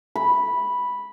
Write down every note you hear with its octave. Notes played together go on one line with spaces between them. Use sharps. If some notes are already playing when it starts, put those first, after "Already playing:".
B5